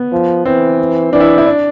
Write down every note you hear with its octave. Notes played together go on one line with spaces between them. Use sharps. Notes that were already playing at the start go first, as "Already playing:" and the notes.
Already playing: B3
F3
E3 C4
E3 D4
E4
E4
D4